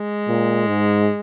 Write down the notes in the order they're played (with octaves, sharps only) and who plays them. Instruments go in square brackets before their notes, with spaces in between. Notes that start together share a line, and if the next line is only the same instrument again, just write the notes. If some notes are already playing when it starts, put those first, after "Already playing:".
Already playing: [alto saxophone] G#3
[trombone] A#2
G#2